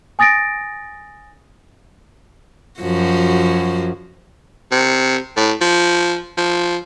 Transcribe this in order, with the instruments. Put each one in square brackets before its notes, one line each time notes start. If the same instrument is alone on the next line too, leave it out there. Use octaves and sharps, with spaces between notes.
[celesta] G#5 D#6 A6 A#6 D7
[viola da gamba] F#2 F3 F#4
[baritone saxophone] C3
A2
F3
F3